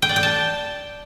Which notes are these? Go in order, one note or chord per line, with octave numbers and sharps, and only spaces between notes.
G5
D5
G5
A5